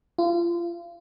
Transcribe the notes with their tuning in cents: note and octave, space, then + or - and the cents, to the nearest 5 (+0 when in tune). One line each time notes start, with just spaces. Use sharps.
F4 -30